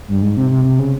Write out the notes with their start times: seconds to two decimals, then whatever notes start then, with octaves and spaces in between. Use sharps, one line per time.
0.08 G2
0.22 G#2
0.37 C3
0.51 C3
0.65 C3
0.79 C#3